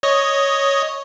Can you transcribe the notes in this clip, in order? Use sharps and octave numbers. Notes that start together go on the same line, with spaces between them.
C#5 D#5